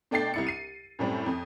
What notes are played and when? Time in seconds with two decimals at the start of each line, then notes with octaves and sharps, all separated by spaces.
0.11 B2 A3 D4 G5 A6 C7
0.34 C2 E4 C#7
0.47 C7 D#7
0.99 F#2 A2 G3 C4
1.26 F2